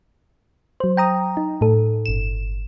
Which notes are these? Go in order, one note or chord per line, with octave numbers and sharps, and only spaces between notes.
F#3 C5
G5 A#5 D#6
D#4
A2 A4
G1 E7